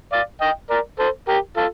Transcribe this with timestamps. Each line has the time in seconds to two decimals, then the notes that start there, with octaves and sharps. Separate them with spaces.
0.12 D5 F5
0.41 D#5 G5
0.70 A#4 D5
0.99 A4 C5
1.28 G4 A#4
1.57 F4 A4